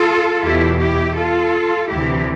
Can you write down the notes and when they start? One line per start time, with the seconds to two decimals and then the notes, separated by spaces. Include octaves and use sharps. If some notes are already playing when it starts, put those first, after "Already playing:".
Already playing: F4 A4
0.43 E2 B2 E4 G4
0.80 E4 G4
1.16 F4 A4
1.89 D2 C3 E3 E4 G4